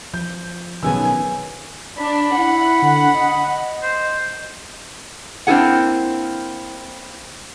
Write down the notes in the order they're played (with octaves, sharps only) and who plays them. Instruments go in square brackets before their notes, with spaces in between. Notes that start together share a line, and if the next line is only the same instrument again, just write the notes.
[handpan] F3 [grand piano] G6
[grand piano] B1 B3 E6 [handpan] D#3 C#4 G#4 [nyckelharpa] G#5
[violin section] D4 [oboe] B5
[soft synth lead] E4 [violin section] F#5
[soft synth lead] D3
D#5
[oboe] C5
[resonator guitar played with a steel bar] A#3 C4 D4 E4 G#4 F#5